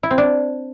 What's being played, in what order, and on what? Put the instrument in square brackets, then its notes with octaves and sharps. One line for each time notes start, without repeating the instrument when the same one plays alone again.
[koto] E4
C4
D4